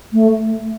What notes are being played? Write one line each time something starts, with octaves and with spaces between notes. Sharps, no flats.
A3